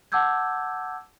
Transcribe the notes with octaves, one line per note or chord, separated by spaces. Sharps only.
F#5 A5 D6 E6 G6 G#6